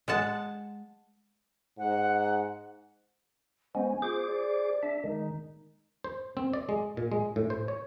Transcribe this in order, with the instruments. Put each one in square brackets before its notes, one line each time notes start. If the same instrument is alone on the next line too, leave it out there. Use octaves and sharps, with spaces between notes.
[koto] G#3 F#5 A5
[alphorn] G#2 [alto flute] F#5
[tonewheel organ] G#3 B3 C#4 [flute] C5
[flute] G#5
[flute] F4 [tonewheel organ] G#4 C5 D6
[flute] D5
[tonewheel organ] D4 E5
[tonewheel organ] D#3 G#3 [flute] D#4
[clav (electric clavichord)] C5
C4
D5
G#3
A#2
G#3
A2
C5
C#5